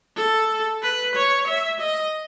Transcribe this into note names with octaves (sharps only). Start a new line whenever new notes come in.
A4
B4
C#5
E5
D#5